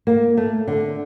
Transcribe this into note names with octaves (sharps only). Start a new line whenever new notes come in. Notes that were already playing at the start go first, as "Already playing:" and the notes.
A#3
A3
D3